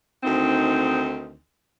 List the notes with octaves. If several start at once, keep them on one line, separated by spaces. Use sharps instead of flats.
D2 D#3 C4 D#4